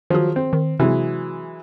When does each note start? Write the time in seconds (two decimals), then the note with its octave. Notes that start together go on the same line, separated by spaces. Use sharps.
0.10 D#3 F3 F#3 G#4
0.36 C4
0.53 D#3
0.80 C3 E3 F#3 G#3 C4